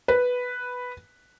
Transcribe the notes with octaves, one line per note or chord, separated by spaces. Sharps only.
B4